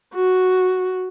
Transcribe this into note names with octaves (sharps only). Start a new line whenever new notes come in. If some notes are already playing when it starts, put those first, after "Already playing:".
F#4